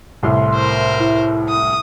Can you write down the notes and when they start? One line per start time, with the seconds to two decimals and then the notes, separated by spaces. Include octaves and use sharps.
0.23 C2 A2 C6
0.54 A#4 C5
1.00 E4
1.49 D#6